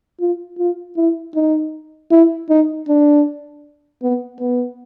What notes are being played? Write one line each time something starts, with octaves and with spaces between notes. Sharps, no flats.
F4
F4
E4
D#4
E4
D#4
D4
B3
B3